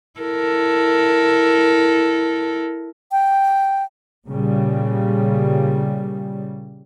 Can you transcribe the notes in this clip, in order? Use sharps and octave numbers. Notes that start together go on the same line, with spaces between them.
E4 A4 A#4
G5
A#2 C#3 G3